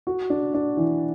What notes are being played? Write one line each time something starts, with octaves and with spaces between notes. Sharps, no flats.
F#4
D4
D4
E3